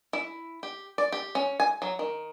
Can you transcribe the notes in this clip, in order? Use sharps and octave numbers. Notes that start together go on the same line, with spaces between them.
E4
G4
D5
G4
C#4
G#5
F#3
D#3